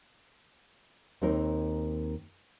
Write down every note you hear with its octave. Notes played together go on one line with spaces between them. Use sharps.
D#2 C4 D#4 A#4